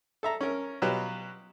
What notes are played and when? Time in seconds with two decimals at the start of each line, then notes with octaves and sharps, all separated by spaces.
0.23 A4 E5 A#5
0.41 C#4 A#4
0.82 B2 F#3 F4 G4 B4